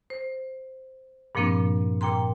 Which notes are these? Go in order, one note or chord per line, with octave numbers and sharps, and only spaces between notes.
C5
G2 A#2 F3 A#3 C4 D4
A#2 G5 A#5 C6